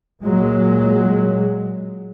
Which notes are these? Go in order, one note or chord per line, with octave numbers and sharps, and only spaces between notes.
A#2 F#3 G#3